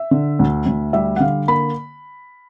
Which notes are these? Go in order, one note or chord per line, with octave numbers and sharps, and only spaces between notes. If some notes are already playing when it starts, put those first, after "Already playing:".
Already playing: E5
D3
D2
D2
G3 E5
F#5
D3 F5
A#3 B5